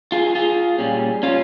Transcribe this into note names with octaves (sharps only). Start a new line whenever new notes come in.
F4 G#4
F4 G#4
A#2 G3 C#4
C#4 F4